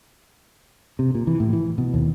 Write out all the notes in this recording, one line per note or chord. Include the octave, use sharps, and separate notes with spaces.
C3
A#2
E3
A2
E3
B2
D#2